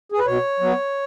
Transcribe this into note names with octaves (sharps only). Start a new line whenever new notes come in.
G#4
B4
B2 C#5
F#3 B3